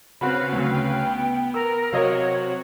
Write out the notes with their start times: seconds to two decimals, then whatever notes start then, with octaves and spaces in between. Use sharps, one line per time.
0.21 C#3 C4 F#4 B4 F5 B5
0.52 D2 F#3
0.71 G5
1.06 B3
1.54 A#4 E6
1.93 C3 F#3 F#4 A#4 C#5 D#5 F5